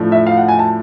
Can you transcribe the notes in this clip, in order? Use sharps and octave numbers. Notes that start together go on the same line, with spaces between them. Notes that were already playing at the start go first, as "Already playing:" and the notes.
Already playing: A2 F3 A3 D4
E5
F5
F#5
G#5
A5